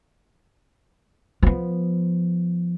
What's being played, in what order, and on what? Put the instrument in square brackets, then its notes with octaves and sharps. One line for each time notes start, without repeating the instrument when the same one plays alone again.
[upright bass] F3 B3